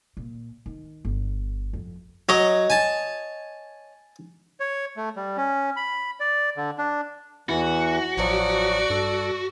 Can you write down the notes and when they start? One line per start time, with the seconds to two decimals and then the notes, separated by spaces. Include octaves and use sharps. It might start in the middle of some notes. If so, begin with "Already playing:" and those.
0.17 A#2
0.66 D#3
1.05 G1
1.73 F2
2.29 F#3 C#5 D#5
2.70 G#5 A5
4.60 C#5
4.97 A3
5.16 G3
5.37 C#4
5.76 B5
6.20 D5
6.57 D3
6.78 D4
7.49 E2 E3 E4 F#4
8.17 A1 F3 F#3 D5
8.90 G2 A4